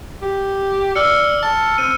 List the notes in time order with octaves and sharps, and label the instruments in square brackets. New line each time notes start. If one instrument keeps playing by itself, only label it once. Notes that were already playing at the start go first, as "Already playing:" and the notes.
[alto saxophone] G4
[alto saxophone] D5 [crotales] E6 F6 C#7
[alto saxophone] A5
[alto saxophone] C4 [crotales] D#7